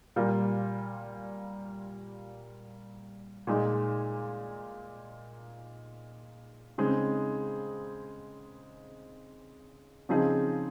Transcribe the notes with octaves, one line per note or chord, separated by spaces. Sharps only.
A#2 G3 A#3 F4
A#2 G#3 D#4
C#3 G#3 C4 D#4 G#4
C#3 F3 C4 D#4 G#4